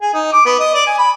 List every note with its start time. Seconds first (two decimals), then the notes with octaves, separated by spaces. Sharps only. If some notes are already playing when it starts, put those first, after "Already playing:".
0.01 G#4
0.14 D#4
0.32 D6
0.45 B3
0.59 D#5
0.74 D5
0.87 G#5
0.98 B5